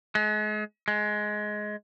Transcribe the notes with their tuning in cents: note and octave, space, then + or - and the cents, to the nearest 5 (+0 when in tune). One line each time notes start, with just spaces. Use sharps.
G#3 +35
G#3 +15